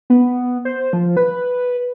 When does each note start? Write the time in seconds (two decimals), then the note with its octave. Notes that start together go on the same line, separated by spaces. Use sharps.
0.10 B3
0.65 C5
0.93 F3
1.17 B4